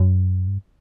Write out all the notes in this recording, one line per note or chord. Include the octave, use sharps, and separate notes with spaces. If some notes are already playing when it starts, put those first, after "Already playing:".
Already playing: F#2
G2